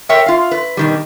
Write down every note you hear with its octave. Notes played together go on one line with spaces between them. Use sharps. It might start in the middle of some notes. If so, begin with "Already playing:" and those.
A4 A#4 C#5 E5 G5
F4 F5
B4
B2 D#3 G3